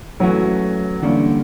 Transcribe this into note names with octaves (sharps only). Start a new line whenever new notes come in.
E3 F#3 A3 C#4 F#4
D3 E3 G3 A#3 C#4